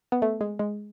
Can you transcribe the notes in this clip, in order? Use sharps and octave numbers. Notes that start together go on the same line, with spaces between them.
B3
A3
G#3
G#3